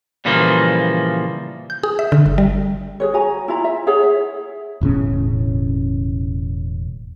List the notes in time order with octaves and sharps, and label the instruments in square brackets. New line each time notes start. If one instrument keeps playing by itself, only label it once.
[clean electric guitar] A#2 C#3 E3 F3 G3 A#3
[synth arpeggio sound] G6
G#4
E5
D3
G1
G3
[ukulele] G#4 B4 C#5
F#4 G#5 A#5
E4 F4 A#5
E5
E4 G#4 C#5 F#5
E5
[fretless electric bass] E1 A2 C#3 C#4